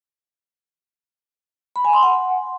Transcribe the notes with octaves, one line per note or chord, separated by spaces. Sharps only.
B5
G#5
C6
F#5